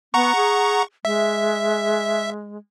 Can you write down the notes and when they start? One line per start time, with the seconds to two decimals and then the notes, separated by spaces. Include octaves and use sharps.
0.14 B3 F#5 A#5 C#6
0.36 G#4
1.05 G#3 E5